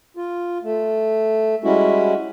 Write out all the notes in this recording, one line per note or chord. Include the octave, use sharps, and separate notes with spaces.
F4
A3
G3 G#3 C#4 E4 F#4